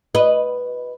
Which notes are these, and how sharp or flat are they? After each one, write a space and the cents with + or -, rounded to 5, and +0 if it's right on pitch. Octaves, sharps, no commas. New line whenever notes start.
F#4 +0 B4 +0 D#5 +0